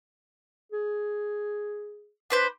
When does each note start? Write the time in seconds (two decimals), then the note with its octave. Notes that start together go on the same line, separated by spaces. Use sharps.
0.72 G#4
2.30 D4 B4 C5